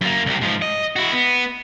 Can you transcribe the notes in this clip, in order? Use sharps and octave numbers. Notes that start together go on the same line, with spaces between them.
F#2 A#3
C2 C3
G#2 F3
D#5
E4 F#4
B3